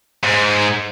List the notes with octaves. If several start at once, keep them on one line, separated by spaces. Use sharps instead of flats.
G#2